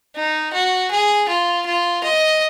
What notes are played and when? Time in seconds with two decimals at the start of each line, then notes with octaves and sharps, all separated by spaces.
0.16 D#4
0.53 F#4
0.91 G#4
1.28 F4
1.66 F4
2.03 D#5